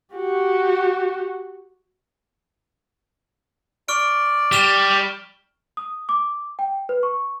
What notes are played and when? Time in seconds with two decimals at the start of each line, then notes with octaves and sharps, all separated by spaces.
0.15 F#4 G4
3.88 D5 C#6 F6 D7
4.52 G3 F6 E7 G7
5.77 D#6
6.09 D6
6.59 G5
6.89 B4
7.03 C#6